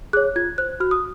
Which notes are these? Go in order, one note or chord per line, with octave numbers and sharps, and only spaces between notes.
G#4 C#5 F#6
F4 G#6
C5 F#6
F#4 F6
D#6